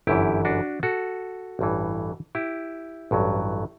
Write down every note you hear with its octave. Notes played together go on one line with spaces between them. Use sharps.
G1 F#2 E3 E4 G4
D4 F#4
F#4 A4
A1 G2 E3
E4 G4
A1 G2 F#3